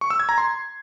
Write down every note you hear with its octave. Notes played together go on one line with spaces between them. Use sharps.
C#6
E6
G#6
A#5
C6